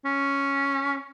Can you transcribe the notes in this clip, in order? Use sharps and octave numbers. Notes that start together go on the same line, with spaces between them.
C#4